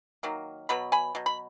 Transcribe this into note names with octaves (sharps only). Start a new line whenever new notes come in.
D#3 F#3 A#3
B2 F#3 B3 B5
G#5 B5
B2 F#3
B5